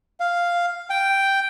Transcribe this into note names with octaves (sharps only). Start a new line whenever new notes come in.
F5
G5